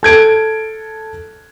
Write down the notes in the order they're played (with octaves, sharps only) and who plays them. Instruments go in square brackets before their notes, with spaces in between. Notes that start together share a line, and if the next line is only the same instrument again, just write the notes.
[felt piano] A4 G#6 D7